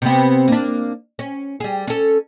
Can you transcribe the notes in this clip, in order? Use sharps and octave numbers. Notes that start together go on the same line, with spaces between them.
C3 B3
A#3 D4
C#4
G3 G#4
C#4 A4